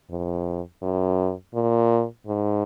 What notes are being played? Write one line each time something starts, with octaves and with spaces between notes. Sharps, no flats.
F2
F#2
A#2
G#2